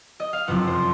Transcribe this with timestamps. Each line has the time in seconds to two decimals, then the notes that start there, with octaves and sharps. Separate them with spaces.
0.20 D#5
0.33 F5
0.47 F#1 F2 C3 F#5
0.68 C5